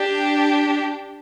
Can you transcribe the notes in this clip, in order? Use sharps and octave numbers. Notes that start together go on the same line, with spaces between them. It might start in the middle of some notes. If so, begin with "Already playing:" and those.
Already playing: D4 G4